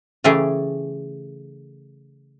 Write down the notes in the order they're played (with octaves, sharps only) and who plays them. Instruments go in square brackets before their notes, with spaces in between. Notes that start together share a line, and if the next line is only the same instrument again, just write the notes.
[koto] C#3 E3 A3 G4 G#4